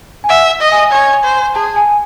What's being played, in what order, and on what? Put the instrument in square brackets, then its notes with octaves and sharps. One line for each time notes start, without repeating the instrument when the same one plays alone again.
[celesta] G#5
[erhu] E5 [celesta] F#5
[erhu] D#5
[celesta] G#5
[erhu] C#5 [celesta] G#5
[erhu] C5
[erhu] G#4 [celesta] A5
[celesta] G#5